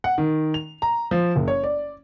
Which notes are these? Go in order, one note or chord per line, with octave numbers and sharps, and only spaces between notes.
F#5
D#3
F7
A#5
F3
F#1
C#5
D5